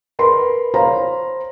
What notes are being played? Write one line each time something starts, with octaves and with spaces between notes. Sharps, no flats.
A#4 B4 B5 C6
C5 C#5 F5 A#5 B5